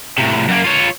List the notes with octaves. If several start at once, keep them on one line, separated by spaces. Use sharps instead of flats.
A2 C3
F#2 A#3
F4 C#5